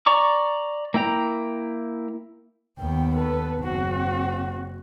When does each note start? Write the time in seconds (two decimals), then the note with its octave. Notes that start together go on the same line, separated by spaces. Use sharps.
0.06 D5 A#5 C#6 D6
0.94 A#3 E4 G5 A#5
2.79 D#2 B3 G5
3.16 A4 B4
3.60 F#1 C4 F#4